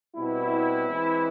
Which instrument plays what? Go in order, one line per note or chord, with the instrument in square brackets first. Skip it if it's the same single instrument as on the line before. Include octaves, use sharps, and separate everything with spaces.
[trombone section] B2 G3 C4 E4
E3 G#3 C4